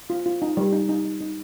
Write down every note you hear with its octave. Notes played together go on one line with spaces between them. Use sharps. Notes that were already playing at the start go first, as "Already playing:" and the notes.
F4
F4
D#4
G3
D#4
D#4
D#4
D#4